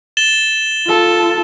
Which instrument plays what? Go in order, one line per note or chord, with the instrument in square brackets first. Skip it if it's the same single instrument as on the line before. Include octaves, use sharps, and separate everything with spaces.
[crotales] A6 E7 G7
[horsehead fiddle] F4 A4